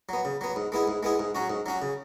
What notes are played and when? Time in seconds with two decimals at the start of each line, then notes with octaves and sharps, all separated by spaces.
0.09 F#3 B3
0.25 C#3
0.41 F#3 B3
0.56 G#2
0.72 G#3 B3 E4 G#4
0.88 G#2
1.03 G#3 B3 E4 G#4
1.19 G#2
1.35 F#3 C#4 F#4
1.50 G#2
1.66 F#3 C#4 F#4
1.82 C#3